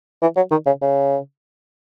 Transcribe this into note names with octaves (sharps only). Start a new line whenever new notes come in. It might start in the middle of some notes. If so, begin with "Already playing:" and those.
E3
F#3
D#3
C#3
C#3